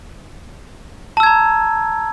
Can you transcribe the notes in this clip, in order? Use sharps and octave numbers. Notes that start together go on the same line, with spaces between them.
A5 A#5 E6 G#6